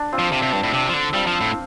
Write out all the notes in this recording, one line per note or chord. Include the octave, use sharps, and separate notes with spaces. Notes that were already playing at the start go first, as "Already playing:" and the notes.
Already playing: D4
C4 F4
F3
C3
C3
G2 D4
A2
C3 D4
F3
D3
G3 C4 F4
F3
A2